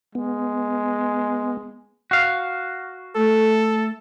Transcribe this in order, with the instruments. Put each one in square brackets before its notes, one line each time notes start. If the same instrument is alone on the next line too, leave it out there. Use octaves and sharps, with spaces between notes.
[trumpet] G#3 [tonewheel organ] B3
[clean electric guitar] F#4 F5
[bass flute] A3 [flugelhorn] A4